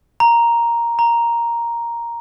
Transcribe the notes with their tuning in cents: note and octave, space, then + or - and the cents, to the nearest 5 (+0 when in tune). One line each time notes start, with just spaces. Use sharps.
A#5 +5
A#5 +5